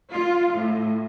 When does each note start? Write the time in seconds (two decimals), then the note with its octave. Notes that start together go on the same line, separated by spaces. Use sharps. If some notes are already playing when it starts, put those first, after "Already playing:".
0.11 F4
0.54 A2